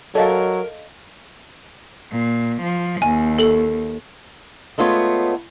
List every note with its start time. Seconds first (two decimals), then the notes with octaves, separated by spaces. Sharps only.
0.15 F#3 A4 A#4 D5 D#5 F5
2.12 A#2
2.62 F3
3.02 D#2 G#5
3.39 A4 F#7
4.78 G#3 A3 B3 F4 C#5